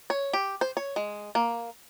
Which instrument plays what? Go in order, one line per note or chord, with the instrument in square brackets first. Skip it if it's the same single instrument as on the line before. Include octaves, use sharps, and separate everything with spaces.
[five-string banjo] C#5
G4
C5
C#5
G#3
A#3